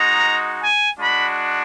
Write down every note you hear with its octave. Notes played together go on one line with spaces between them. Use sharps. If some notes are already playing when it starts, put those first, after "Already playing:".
Already playing: G#3 D#4 F#4 A#5
G#5
G#3 D4 F#4 B5